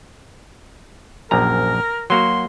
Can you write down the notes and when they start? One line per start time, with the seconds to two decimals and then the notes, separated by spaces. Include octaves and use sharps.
1.31 A#1 F#2 A#4 A#5
2.10 F#3 A#3 F#4 C6